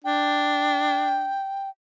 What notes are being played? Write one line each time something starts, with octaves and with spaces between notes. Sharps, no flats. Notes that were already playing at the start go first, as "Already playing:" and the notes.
D4 G5